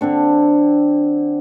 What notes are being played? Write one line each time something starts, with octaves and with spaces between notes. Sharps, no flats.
D3 C4 D4 C#6